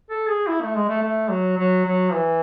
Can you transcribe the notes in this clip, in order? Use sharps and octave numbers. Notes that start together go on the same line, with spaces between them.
A4
G#4
E4
A3
G#3
A3
A3
F#3
F#3
F#3
E3